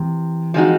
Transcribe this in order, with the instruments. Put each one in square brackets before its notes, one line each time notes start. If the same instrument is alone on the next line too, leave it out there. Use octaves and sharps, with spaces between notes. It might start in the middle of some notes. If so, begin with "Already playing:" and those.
Already playing: [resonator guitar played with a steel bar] C3 [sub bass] E3
[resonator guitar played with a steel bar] F3 G#3 C4 D#4 F#4